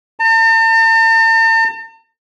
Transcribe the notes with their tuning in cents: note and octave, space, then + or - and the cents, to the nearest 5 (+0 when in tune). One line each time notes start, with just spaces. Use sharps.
A5 +45